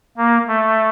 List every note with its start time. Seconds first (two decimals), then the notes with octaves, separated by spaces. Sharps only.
0.18 A#3
0.48 A3